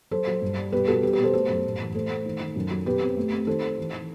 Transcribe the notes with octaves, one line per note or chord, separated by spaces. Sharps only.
F#3 A4 C5
F#3
G2
G3
B2 G4 B4
B2 F#4 A4
G3 G4 B4
G4 B4
B2
A4 C5
A3 A4 C5
F#2
A2
E3
A3 A4 C5
A3
D#3
D#3
F#2
F#3
B2 G4 B4
C4
A3
C4
D#3 A4 C5
D#3
E3
E3